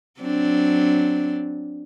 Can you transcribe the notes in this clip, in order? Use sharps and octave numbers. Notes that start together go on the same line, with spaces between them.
F#3 C4 D4